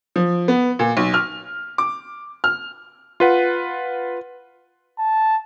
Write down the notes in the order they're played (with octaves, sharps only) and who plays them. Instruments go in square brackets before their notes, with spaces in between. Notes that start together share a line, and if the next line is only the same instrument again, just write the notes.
[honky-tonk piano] F3
B3
A#2
B1
F6
D6
F6
[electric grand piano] F4 B4 F#5
[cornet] A5